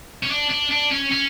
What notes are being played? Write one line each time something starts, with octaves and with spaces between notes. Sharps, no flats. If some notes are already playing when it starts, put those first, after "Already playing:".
C#4
D4
D4
D4
C#4
C#4